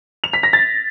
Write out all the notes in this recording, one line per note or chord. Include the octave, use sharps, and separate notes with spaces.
F7
B6
A#6
A6